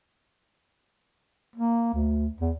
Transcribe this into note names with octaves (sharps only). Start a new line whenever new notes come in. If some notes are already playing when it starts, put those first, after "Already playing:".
A#3
D2
E2